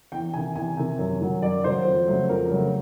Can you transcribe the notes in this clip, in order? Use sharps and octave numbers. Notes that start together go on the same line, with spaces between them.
E2 G5
C3 D#3 G#5
E2 G#5
C3 D#3
F#2
D#3 F#3
F#2 D5
D#3 F#3 C5
F2
C#3 F#3 A3
F2 A#4
C#3 F#3 A3